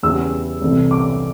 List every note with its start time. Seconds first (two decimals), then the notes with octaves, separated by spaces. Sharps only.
0.03 E2 C#3 E3 G3 B3 E6
0.62 C2 C3 E3 A3
0.91 D6